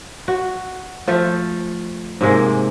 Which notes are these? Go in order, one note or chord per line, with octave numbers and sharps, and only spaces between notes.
F#4
F3 A3
G#2 C3 G#3 A#3